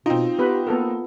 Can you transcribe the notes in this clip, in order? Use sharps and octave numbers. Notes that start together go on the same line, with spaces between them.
B2 C4 D#4 F4
B3 G4 B4
A#3 B3 A4 A#4